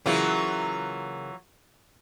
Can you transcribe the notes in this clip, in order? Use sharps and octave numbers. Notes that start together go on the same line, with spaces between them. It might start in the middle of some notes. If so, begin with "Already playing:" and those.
C#3 E3 F#3 A#3 E4 F4